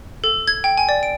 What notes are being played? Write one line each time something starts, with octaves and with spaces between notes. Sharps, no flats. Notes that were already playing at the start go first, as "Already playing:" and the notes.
A4
G#6
G5
G#5
D5
D7